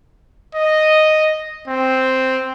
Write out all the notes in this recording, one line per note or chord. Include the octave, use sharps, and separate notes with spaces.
D#5
C4